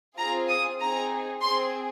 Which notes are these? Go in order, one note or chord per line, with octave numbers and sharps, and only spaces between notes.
C4 F4 G#4 A#5
D#6
C4 D#4 G#4 A#5
C4 G#4 C6